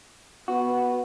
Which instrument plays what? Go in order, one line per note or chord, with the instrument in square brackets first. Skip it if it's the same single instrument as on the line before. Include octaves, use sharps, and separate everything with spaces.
[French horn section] B3 [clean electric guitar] F#4